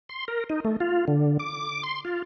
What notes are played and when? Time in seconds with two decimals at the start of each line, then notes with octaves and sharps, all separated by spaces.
0.09 C6
0.28 A#4
0.50 D#4
0.65 A3
0.80 F4
1.08 D3
1.39 D6
1.84 C6
2.05 F4